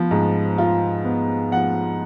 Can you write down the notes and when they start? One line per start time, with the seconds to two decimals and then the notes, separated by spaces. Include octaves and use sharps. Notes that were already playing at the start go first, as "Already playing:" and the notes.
Already playing: F3 B3
0.11 G#2
0.58 F4
1.05 B3
1.52 F3 F#5